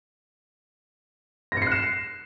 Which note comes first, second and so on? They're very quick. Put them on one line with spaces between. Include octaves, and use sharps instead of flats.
A#6 C#7 C7 F#6 E7